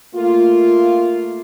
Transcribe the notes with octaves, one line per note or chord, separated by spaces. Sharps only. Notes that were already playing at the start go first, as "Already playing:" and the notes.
A3 A#3 F4